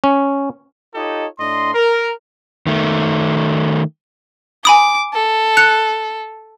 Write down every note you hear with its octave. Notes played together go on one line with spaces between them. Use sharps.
C#4
D#4 F4 G4 A4 C#5 D#5
A2 D4 D#5 C6
A#4
D#3 A3
G#5 B5 D6 D#6
A4
F#6 C#7 F7